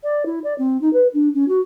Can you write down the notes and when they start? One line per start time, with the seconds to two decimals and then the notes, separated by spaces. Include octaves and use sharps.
0.04 D5
0.26 E4
0.44 D5
0.58 C4
0.81 D#4
0.93 B4
1.13 D4
1.34 C#4
1.48 F#4